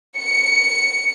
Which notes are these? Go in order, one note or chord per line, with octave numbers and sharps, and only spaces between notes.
C#7